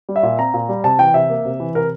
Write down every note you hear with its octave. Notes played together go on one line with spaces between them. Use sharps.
G3
E5
A#2
C4 A#5
A#2
G3
C3 A5
E3 G5
C3 E5
A#3
C3
E3
C3 A#4